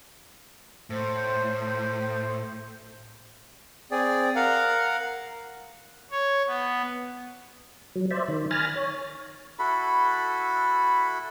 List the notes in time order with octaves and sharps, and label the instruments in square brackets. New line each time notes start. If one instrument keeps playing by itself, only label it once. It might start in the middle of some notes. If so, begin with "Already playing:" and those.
[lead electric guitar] A2 [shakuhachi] C5
[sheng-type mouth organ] C4 G#4 D5
A#4 F5 F#5
[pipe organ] C#5
B3
[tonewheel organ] F#3
C5 D5 E5
D#3
G#5 B5 F6 A6 A#6
C#5
[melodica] E4 F#4 A4 B5